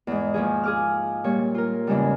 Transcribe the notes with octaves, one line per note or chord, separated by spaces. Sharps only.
E2 G#2
D#2 F3 G#4
G#4 D6 F6
A#2 G3 C#5
F4 A#4
E2 G#2 C#3 G3